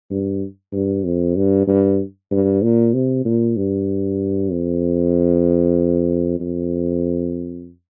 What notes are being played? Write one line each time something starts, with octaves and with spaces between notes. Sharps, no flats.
G2
G2
F2
G2
G2
G2
A#2
C3
A#2
G2
F2
F2